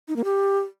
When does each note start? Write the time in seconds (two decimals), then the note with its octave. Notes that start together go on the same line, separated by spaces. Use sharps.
0.08 D#4
0.16 A#3
0.24 G4